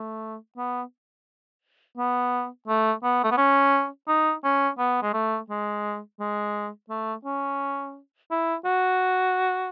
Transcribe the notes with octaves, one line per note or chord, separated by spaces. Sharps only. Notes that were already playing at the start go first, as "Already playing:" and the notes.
Already playing: A3
B3
B3
A3
B3
A3
B3
C#4
D#4
C#4
B3
G#3
A3
G#3
G#3
A3
C#4
E4
F#4